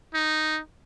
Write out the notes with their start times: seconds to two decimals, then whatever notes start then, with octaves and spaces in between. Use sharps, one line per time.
0.14 D#4